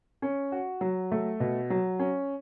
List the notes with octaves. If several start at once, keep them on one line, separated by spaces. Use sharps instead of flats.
C#4
F#4
F#3
A3
B2
F#3
C#4